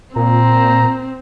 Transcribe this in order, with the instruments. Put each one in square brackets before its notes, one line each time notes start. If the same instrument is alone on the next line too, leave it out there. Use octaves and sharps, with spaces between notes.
[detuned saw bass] A#2 [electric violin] C4 [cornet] A#5